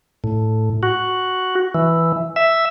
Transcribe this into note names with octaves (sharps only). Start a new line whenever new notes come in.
A2
F#4
E3
E5